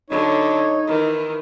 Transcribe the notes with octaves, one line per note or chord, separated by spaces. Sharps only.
D3 F#3 D#4 C#5
D#3 E3